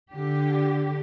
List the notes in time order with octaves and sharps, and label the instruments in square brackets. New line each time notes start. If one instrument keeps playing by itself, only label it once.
[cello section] D3 G4